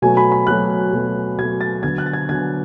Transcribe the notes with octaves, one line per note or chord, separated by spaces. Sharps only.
B2 F#3 A3 G#5
B5
B5
B2 F#3 A3 F#6
B2 F#3 A3
B2 F#3 A3 G#6
A6
D3 F#3 B3 G#6
F#6
A6
G#6
D3 F#3 B3 G#6